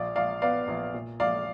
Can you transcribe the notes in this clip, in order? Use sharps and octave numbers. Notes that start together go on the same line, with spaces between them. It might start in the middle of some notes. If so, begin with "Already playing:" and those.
Already playing: A#1 D5 F5
A#1 D5 F5
B3 D5 F5
A#1
A#2
A#1 D5 F5